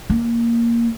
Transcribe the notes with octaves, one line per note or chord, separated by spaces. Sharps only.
A#3